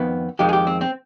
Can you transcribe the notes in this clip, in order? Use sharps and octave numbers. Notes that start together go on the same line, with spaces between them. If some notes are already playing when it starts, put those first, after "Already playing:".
Already playing: F2 D#3 B3
F2 D#3 G#3 G4
G#4
G4
C4
C4